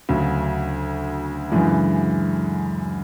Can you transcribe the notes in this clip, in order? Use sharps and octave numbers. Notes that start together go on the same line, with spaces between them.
D2 C#3 F#3
F#2 C#3 E3 G#3 D4